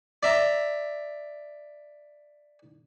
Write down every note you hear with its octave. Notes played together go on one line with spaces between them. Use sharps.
D5 E5 A#5